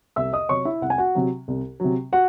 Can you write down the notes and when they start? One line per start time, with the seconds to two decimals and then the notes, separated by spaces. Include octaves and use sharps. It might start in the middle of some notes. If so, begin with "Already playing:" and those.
0.16 C2 E5 E6
0.33 D#5 D#6
0.49 C3 F#3 C#5 C#6
0.65 E4 E5
0.82 C2 F#5
0.90 G#5
0.98 F#4 F#5
1.15 C3 F#3
1.48 C2
1.80 C3 F#3
2.13 F#4 F#5